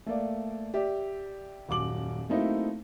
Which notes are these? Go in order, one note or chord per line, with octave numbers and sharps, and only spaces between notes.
A3 A#3 D5
G4 D5 E5
D#1 F#2 D6 F#7
F#3 A3 A#3 C4 D#4 E4